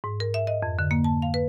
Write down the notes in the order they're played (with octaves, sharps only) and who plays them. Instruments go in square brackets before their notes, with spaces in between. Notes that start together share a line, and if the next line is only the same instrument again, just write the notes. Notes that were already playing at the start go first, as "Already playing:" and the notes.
[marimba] G#2
A#4
E5
D#5
F2
D3
A#3
A5
F5
B4